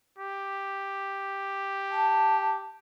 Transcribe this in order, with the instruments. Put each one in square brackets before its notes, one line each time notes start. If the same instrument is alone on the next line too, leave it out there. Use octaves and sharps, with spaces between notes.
[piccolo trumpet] G4
[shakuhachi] A5